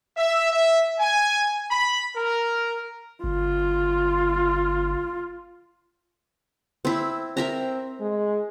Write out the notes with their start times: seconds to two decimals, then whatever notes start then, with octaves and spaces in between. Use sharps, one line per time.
0.17 E5
0.51 E5
0.99 G#5
1.71 B5
2.16 A#4
3.24 G1 F4
6.85 C4 E4
7.37 C4 A#4 E5 A#5
8.00 G#3